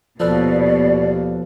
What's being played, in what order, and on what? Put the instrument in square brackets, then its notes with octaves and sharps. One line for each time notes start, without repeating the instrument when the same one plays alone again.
[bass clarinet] D#2 [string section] B2 [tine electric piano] F3 A4 B4 [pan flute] D5